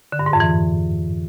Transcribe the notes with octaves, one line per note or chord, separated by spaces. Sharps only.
D3
G2
G#2
F2
E3